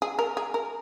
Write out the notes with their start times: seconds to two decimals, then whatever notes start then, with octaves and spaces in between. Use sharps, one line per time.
0.02 G#4
0.19 A#4
0.37 G#4
0.54 A#4